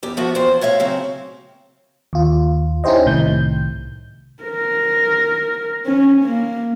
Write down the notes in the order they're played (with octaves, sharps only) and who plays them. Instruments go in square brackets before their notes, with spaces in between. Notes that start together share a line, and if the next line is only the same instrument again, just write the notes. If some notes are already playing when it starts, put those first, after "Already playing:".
[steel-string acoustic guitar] E2 G4
F3 B3 F#4 E5
E2 F3 C5 G5
A2 C#5 E5 F5
C#3 F#3 C4 C#4
[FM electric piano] D#2 F4
C#4 D#4 E4 G4 C5 D#5
C2 A2 C3 D#3 G6
[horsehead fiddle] A#4
C#4
A#3